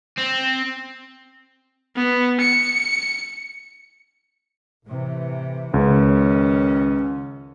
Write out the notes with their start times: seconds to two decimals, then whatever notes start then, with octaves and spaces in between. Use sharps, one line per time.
0.18 C4
1.96 B3
2.40 C#7
4.87 A2 C3 E3
5.74 C#2 D#3 C#4